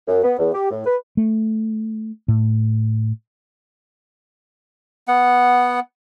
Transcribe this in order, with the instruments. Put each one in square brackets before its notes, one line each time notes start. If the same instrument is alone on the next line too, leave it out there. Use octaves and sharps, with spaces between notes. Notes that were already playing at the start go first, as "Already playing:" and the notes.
[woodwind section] F#2
B3
E2
G4
A2
B4
[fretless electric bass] A3
A2
[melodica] B3 F#5